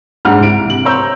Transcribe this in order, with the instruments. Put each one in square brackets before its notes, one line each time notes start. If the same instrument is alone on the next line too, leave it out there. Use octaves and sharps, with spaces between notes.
[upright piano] G#2 D4 F#5 F6
C2 D7
C3 F#7
C5 C#5 A#5 E6 G6